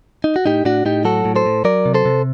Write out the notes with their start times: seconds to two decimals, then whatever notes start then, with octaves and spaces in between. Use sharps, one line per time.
0.24 D#4
0.36 F#4
0.46 A2 D#4 G4
0.65 A2 D4 F#4
0.85 A2 D#4 G4
1.05 F#3 F#4 A4
1.25 A2
1.36 A4 C5
1.46 A2
1.65 F#3 A#4 D5
1.86 C3
1.94 A4 C5
2.05 C3